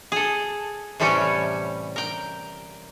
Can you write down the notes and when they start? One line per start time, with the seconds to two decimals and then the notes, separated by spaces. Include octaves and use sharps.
0.12 G#4 A4
1.00 A2 C3 E3 G3 C#4 C#5
1.96 A#4 G5